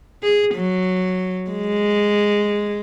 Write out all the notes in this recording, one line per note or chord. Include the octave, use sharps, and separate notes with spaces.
G#4
F#3
G#3